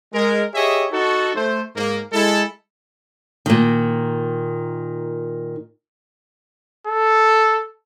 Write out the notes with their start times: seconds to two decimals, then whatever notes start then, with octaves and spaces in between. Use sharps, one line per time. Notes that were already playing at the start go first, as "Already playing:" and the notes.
0.13 G#3 A#4
0.54 G4 G#4 C#5 D#5 E5
0.91 D#4 F#4 A4
1.35 A3 C5
1.76 G#2 A#3
2.12 G#3 E4 A4
3.46 A#2 D#3
6.87 A4